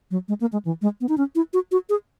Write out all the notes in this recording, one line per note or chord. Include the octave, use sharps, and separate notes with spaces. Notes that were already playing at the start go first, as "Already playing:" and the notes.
F#3
G#3
A#3
G#3
E3
G#3
B3
D#4
C#4
E4
F#4
F#4
G#4